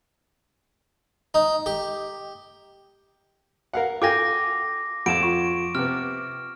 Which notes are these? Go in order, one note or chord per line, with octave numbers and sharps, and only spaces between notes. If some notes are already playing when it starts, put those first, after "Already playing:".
D#4
G4
A#4 F5 F#5
F4 A4 G5 G#5 D6 A#6
F2 F#5 D6 D7 E7
F4 C#6
C3 B3 F6